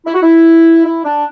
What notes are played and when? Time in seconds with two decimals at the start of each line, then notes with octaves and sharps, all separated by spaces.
0.06 E4
0.14 F#4
0.22 E4
0.85 E4
1.05 D4